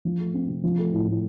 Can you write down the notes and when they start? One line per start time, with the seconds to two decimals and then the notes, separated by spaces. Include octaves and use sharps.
0.05 F3
0.20 A3
0.34 C4
0.49 C3
0.64 F3
0.78 A3
0.92 A2
1.07 A2